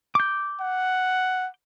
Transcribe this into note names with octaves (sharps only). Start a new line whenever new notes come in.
D6 G6
F#5